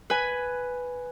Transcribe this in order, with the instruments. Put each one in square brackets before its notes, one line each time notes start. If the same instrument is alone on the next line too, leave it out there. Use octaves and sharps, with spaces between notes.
[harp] B4 G#5